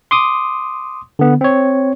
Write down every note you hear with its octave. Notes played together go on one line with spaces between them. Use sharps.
C6 D6 D#6
D3 B3
C4 C#5